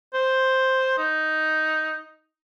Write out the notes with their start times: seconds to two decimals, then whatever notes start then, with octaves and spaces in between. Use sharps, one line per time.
0.14 C5
0.98 D#4